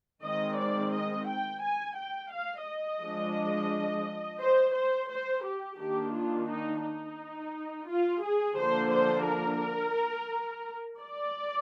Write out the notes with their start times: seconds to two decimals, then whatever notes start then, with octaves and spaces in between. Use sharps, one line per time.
0.24 D#3 G#3 C4 D#5
0.58 D5
0.94 D#5
1.27 G5
1.63 G#5
1.98 G5
2.33 F5
2.67 D#5
3.01 F3 G#3 D4
4.41 C5
4.75 C5
5.10 C5
5.45 G4
5.79 D#3 A#3 D4 G4
6.14 F4
6.49 D#4
6.83 D#4
7.88 F4
8.22 G#4
8.57 D3 F3 A#3 D4 C5
8.91 C5
9.27 A#4
11.00 D5